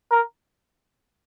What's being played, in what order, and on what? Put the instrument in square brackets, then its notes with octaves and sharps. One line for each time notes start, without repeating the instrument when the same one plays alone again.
[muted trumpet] A#4